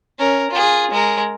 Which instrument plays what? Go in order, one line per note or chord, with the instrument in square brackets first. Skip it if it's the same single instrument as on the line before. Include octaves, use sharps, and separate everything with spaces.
[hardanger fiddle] C#4 A#4
F4 G#4
G#3 A#4